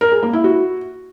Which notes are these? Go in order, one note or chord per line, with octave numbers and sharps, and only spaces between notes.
A#4
G#4
A#3
E4
F#4